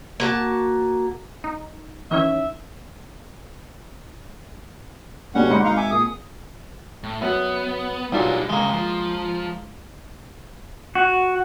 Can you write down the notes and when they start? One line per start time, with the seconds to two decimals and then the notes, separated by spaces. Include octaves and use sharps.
0.20 A#3 F#4 A5
1.44 D#4
2.11 D#3 E3 C#4 E5
5.35 G2 B2 D3 G3 C#4 F#5
5.50 G#2 B5 C#7
5.65 G#1 D#4 F5
5.77 E5 G#5 D6
5.91 A#2 G#4 D#6
7.03 A2
7.22 F#2 B3
8.12 B1 A#2 G3 D4 G#4
8.49 D#2 C#3 G#3 A#3
8.73 F3
10.95 F#4